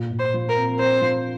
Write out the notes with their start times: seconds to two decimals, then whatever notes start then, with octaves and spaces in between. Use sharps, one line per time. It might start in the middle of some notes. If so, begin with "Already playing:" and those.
Already playing: A#2
0.11 A#2
0.19 C5
0.34 F3
0.49 A#4
0.56 C4
0.79 C4 C5
1.02 F3